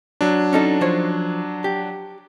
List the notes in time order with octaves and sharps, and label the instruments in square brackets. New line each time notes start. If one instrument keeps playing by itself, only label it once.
[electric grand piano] F#3 D4
[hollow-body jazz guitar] C#4 D#4 A4
F3 C5 C#5
G4